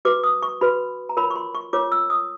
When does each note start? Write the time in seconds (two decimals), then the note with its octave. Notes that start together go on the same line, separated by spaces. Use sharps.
0.05 F#4 B4 D6
0.24 D#6
0.42 C#6
0.61 F#4 B4 B5
1.09 A#5
1.17 F4 A#4 C#5 B5
1.30 C#6
1.36 C6
1.55 C#6
1.73 F4 A#4 C#5 D6
1.92 E6
2.10 D#6